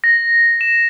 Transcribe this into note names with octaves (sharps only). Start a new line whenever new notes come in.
A#6
E7